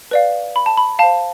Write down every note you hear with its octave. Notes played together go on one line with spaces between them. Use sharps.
B4 D5 F5
B5
A5
B5
C5 F5 A5